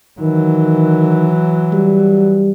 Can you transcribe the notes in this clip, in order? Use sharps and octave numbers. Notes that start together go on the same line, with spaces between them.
D#3 E3 F#3
G3